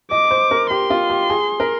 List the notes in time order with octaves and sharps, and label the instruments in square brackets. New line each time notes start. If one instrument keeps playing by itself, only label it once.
[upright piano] D#5 [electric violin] D6
[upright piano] C5
A#4
[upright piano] G4 [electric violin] C6
[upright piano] F4
G4
G#4
A#4